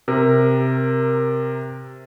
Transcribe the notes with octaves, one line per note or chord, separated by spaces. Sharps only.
C3 A#4